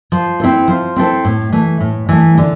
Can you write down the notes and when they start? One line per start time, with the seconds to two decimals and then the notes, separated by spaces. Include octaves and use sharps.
0.12 F3
0.40 C4 E4 A4 C5
0.68 F3
0.96 C4 E4 A4 C5
1.25 A2
1.52 E3 A3
1.81 A2
2.09 E3 A3
2.38 D3